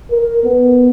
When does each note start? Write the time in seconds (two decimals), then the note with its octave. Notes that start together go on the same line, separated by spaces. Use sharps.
0.11 A#4
0.44 B3